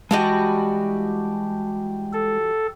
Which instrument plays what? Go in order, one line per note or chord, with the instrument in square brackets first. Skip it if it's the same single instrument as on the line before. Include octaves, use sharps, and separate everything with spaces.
[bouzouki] E3 G3 F#4 [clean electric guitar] G#3 D#5 [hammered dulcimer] G4 F#5 A5
[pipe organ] A4